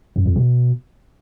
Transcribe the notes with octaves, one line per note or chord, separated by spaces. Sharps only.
F#2
F2
B2